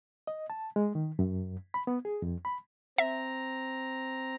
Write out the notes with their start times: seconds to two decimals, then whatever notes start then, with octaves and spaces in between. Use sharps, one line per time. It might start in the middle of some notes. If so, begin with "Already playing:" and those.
0.27 D#5
0.50 A5
0.76 G#3
0.95 D#3
1.19 F#2
1.74 B5
1.87 B3
2.05 G#4
2.22 F2
2.45 B5
2.98 C4 E5 A#5